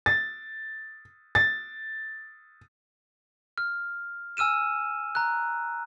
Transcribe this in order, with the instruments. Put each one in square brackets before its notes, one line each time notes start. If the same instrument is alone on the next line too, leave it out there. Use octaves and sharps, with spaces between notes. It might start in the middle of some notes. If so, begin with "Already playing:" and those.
[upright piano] A6
A6
[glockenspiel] F6
G#5 E6 F6 D#7 E7
A#5 F#6